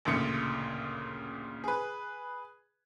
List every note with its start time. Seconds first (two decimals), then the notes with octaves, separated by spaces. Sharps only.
0.05 A1 D2 A#2 C#3 C#7
1.64 G#4 B4